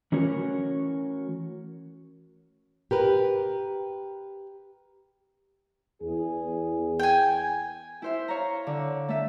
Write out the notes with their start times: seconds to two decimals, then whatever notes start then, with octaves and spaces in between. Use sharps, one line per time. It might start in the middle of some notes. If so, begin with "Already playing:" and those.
0.12 E3 A3 C#4 F#4 A#4 C#5
2.91 G4 A#4 B4
6.02 E2 G#4
6.99 G5 G#5
8.02 E4 C5 E5
8.28 C#5 F5 A#5
8.67 D3
9.08 A3 E5